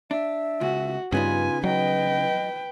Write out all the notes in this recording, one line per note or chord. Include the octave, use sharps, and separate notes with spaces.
D4 E5
C#2 F#4
G2 C#3 B3 D#4 F4 G#5
F#3 B4 D#5 G5